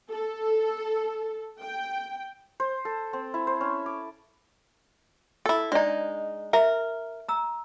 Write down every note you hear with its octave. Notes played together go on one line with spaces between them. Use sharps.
A4
G5
C5
A4
C4
E4
C5
C#4
D6
E4 A4
G#3 D4 D#4 D5 D#5
A#4 E5
A#5 E6